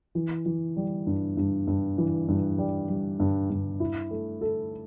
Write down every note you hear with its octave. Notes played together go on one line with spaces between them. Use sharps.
E3
E3
G3
G2
G2
G2
E3
G2
G3
G3
G2
G2
E4
A3
A4